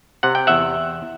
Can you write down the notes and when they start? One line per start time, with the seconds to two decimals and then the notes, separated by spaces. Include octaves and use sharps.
0.23 C3 F#5
0.35 G5
0.47 E2 E5 F#5